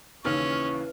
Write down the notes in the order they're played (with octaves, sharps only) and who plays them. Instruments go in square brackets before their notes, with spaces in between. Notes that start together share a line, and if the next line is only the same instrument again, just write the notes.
[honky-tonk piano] D#2 C#3 F6 [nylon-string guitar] E3 [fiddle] C#4 [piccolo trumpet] C#6